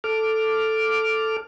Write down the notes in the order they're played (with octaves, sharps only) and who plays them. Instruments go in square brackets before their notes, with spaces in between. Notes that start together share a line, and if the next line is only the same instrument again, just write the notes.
[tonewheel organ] A4 D6 F6